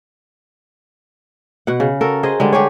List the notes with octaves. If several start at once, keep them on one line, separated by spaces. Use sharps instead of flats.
B2 F#5
C#3
F#4 A4 A#4
G#4 C5 D#5
D3 G3 G#3
D3 G4 G#4 C#5